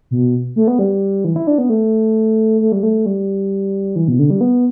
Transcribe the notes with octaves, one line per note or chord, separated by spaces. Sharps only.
B2
A3
B3
G3
E3
E4
D4
B3
A3
A3
G3
A3
G3
E3
B2
D3
G3
B3